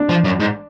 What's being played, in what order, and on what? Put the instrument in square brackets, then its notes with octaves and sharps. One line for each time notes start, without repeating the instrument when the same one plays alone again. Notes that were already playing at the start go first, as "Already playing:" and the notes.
Already playing: [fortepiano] D4
[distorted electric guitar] F3
F#2
G#2